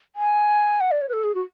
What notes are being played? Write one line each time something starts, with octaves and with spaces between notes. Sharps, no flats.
G#5
F#5
D5
C#5
B4
A4
G#4
F#4